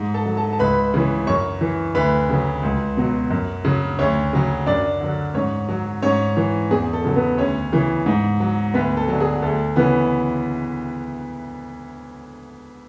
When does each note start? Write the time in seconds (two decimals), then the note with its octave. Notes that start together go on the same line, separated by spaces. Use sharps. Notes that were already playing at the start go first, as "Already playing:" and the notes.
Already playing: G#2
0.14 A4 A5
0.25 F#3
0.37 A4 A5
0.53 A5
0.59 C#2 B4 B5
0.94 C#3 E3
1.27 F#2 C#5 C#6
1.61 E3
1.95 D2 B4 B5
2.30 C#3 F#3
2.63 C#2
2.97 B2 F#3
3.31 F#2
3.65 C#3 F#3
3.99 D2 C#4 C#5
4.33 C#3 F#3
4.66 F#2 D4 D5
5.01 D3 F#3
5.34 G#2 C#4 C#5
5.69 F#3
6.02 G#2 C#4 C#5
6.37 E3
6.71 E2 G#4
6.93 A4
7.05 C#3 F#3
7.16 B3 B4
7.38 D2 C#4 C#5
7.72 C#3 E3
8.06 G#2
8.40 F#3
8.74 D2 B3 B4
8.97 A4
9.08 D3 F#3
9.20 G#4
9.42 D2 A4
9.76 C#3 E3 B3 B4